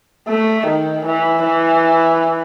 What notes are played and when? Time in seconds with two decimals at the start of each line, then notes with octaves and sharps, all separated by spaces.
0.28 A3
0.67 D#3
1.05 E3
1.44 E3